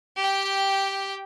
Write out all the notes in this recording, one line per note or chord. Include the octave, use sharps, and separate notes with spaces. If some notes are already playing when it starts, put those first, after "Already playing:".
G4 G5